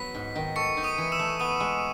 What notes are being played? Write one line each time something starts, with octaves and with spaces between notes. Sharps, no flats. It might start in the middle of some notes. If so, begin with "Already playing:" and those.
Already playing: F#3 B3 B6
G#2
D#3
A4 C#6 C#7
D#4
D#6 D#7
E3
E6 E7
A3
B3 D#6 D#7
G#3